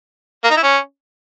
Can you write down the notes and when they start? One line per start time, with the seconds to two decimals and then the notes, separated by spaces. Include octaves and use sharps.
0.44 A#3
0.50 D#4
0.57 E4
0.63 C#4